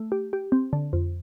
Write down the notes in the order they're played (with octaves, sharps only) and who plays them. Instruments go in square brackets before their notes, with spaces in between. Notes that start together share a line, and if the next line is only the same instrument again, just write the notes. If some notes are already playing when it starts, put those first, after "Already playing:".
Already playing: [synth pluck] A3
G4
G4
C4
D3
F2